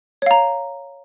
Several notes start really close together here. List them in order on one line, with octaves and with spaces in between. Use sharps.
C#5 F5 A#5